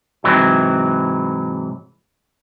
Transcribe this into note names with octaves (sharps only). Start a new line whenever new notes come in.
G#2 C3 E3 F#3